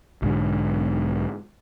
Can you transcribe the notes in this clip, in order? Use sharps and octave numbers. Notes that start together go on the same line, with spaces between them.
B1 G#2 D3